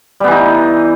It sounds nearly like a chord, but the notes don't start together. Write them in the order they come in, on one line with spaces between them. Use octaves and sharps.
G3 B3 E3 D#4